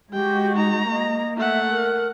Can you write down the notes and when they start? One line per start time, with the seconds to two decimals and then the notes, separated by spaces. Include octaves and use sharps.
0.13 G#3 F#4 G4 G5
0.56 D#4 A#5
0.91 A#3 D#5
1.37 A3 E5 F#5
1.70 A#4